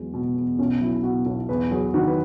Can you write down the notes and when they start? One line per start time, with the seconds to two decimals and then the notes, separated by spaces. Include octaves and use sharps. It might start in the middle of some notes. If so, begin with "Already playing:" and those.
Already playing: E2 F#3 G#3
0.14 B2
0.36 E2
0.59 B1 C#4
0.81 F#3 E4
1.03 B2 F#4
1.26 B1
1.49 E2 B4
1.71 F#3 G#4
1.94 D#3 F#4
2.07 B4